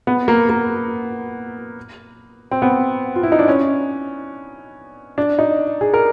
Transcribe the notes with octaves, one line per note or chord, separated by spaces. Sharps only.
B3
A#3
A#3
C4
B3
F4
E4
D#4
D4
C#4
D4
D#4
G#4
A#4